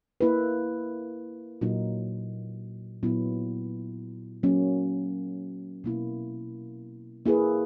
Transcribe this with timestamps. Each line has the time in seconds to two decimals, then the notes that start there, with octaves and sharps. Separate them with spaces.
0.21 A#3 E4 B4
1.61 A#2 F#3 A#3 D#4
3.03 A#2 F#3 B3 E4
4.43 F#3 A#3 C#4
5.84 B2 A#3 E4
7.25 A#3 E4 G#4 B4